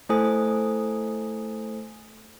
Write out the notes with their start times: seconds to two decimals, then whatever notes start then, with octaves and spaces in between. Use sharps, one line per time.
0.09 A3 E4 A4 C5 G#5 D#6